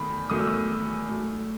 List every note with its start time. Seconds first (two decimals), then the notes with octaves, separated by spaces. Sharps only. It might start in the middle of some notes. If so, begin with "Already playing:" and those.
Already playing: E2 D#3 A3 B5
0.30 E2 D#3 F#3 A3 D#6
0.39 E6
0.47 D#6
1.09 A2 F#3 A3